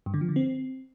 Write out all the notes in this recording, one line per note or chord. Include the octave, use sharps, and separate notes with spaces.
G2
D3
F3
D3
C4